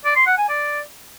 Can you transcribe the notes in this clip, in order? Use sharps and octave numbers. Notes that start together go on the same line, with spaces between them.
D5
C6
F#5
G#5
D5